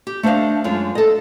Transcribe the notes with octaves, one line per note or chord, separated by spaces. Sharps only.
G4
A3 D4 C5 D#5 F5
F#2 G#3 F4
A4 D#5